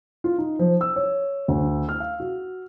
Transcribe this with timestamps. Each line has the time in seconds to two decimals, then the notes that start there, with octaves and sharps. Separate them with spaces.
0.24 F4
0.38 D#4
0.59 F3
0.81 E6
0.96 C#5
1.48 D2
1.89 F6
2.00 F5
2.20 F#4